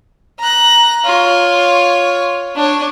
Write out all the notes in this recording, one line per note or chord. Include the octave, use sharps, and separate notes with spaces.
A#5 F#6
F4 C#5
D4 C#5